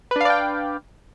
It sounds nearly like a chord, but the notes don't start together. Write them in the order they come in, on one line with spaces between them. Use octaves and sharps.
B4 D4 F5 D5 G5